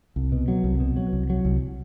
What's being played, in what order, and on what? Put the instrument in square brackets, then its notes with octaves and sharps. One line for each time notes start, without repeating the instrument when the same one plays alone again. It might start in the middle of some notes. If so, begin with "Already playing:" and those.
[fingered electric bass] C2
B2
F#3
C2
B2
F#3
C2
F#3
C2